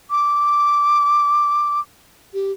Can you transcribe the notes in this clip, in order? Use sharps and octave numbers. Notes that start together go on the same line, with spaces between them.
D6
G4